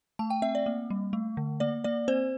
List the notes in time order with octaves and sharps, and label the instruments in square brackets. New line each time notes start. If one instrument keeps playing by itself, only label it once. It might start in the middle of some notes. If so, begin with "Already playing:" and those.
[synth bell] A3 A5
G5
C4 E5
D5
A#3
G3
A3
D3
A#3 D5
A#3 D5
C4 C5